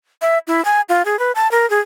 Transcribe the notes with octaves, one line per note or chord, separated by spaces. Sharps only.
E5
E4
G#5
F4
G#4
B4
A5
A#4
G#4